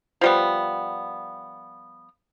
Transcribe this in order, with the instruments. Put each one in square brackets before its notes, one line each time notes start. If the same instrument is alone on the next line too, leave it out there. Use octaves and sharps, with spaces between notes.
[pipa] F3 G3 B3